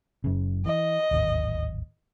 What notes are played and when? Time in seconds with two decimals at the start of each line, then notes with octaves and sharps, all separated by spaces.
0.24 F#1 F#2 C#3
0.66 E3 D#5
1.11 D1 G#1 D#2